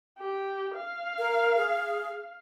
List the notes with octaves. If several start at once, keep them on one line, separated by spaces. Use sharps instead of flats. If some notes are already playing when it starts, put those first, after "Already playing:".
G4
F5
A#4
G#4